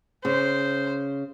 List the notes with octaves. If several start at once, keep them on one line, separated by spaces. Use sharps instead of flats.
C#3 C5